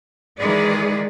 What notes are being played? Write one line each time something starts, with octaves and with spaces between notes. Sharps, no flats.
D#3 E3 G#3 G#4 B4 D5